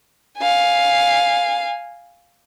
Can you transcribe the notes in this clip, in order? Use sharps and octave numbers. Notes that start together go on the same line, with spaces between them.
F5 G#5